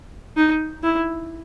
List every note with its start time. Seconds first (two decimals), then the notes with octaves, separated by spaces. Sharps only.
0.37 D#4
0.84 E4